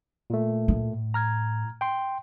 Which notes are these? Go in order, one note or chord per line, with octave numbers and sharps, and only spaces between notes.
A#2 A3
A2
A#5 F6 G#6
G5 C6